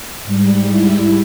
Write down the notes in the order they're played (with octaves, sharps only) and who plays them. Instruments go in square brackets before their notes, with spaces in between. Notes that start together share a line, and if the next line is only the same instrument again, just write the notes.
[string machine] G#2 G3
E4